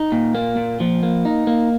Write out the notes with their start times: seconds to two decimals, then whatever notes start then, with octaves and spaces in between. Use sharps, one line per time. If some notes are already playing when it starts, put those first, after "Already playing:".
Already playing: D#4
0.12 A#2
0.35 A#3
0.57 A#2
0.80 F3
1.03 A#3
1.25 D#4
1.47 A#3